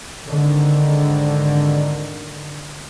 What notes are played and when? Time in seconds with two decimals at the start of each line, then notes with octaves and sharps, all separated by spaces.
0.24 G#1 D3 D#3